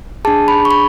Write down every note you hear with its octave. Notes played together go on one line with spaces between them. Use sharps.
D4 G#4 A5
B5
C#6
B5